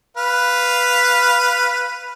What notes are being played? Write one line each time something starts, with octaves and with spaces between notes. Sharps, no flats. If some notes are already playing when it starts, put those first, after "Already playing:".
B4 F5